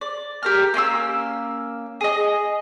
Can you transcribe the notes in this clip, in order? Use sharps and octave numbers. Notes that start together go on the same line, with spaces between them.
D5
G4 A#4 F6
A#3 C#4 C6 E6
G#4 D#5